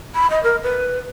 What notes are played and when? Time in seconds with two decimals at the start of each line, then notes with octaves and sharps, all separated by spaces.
0.15 B5
0.30 D#5
0.43 A#4
0.63 B4